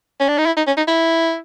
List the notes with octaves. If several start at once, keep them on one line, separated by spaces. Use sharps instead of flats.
C#4
D4
D#4
E4
D#4
C#4
D#4
E4